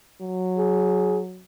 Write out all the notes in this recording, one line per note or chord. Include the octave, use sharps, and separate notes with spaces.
F#3
G#4